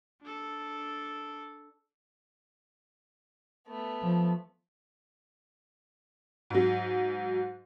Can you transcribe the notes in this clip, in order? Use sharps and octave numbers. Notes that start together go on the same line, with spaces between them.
D4 A4
A3 B3
F3
G#2 F#3